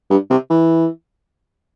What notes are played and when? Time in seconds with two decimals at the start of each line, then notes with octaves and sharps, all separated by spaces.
0.10 G2
0.30 C3
0.50 E3